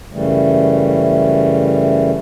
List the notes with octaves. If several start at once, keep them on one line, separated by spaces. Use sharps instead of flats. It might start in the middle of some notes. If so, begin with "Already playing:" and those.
F#2 C#3 E3 G3 A3